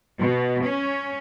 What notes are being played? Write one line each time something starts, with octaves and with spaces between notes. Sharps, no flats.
B2
C#4